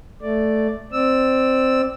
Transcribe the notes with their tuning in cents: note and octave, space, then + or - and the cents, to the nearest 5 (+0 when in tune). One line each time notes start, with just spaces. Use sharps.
A3 +0 D5 +0
C4 +0 D5 +10 E6 -5